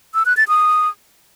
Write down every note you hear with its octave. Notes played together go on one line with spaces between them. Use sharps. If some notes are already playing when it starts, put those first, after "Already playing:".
E6
F#6
A6
D#6